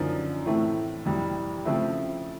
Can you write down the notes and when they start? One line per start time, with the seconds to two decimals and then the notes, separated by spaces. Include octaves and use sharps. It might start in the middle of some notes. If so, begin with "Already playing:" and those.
Already playing: F#2 D3 F3 A#3 D#4
0.46 A2 E3 A3 C4
1.05 F2 C3 E3 G3
1.65 C#3 F3 A3 C4 E4